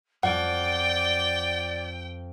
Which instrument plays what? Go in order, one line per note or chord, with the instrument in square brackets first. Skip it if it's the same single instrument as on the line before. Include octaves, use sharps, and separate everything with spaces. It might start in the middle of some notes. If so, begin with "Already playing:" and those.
[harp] F2 [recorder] D5 [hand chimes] F#5 [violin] G5